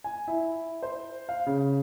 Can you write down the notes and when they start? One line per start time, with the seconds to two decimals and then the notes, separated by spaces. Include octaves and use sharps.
0.04 G#5
0.28 E4
0.83 C5
1.29 F5
1.46 C#3